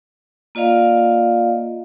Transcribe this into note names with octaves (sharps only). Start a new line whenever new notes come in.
A#3 F4 D5 D#5 F5